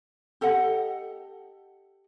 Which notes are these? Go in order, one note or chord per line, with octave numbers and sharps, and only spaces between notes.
G4 A4 D#5 F#5